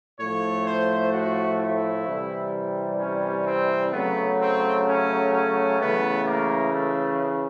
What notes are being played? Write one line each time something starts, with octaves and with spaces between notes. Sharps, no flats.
A2 F3 A3 C#5
C5
F#4
E4
C3 E3 G3
C#4
C4
C#3 F#3 A3 B3
C4
C#4
C#4
C#3 E3 A3 B3
A#3
A3